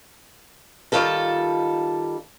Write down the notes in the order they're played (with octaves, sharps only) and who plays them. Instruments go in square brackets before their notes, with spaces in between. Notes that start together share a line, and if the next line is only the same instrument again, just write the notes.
[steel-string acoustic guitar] D#3 G3 F4 A4 A5